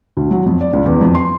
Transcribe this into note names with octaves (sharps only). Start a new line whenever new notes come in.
D2
F#3
F2
D5
C#2
E2
F2
C6